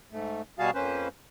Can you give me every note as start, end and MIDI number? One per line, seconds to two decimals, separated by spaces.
0.12 0.42 44
0.12 0.42 57
0.59 0.71 47
0.59 0.71 55
0.59 0.71 66
0.59 0.71 68
0.59 0.71 77
0.59 0.71 81
0.75 1.08 41
0.75 1.08 58
0.75 1.08 61
0.75 1.08 71
0.75 1.08 72